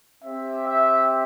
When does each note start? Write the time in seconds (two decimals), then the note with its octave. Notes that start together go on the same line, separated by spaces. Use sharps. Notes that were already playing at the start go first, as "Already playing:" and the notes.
0.24 C4 G4 E5
0.68 E5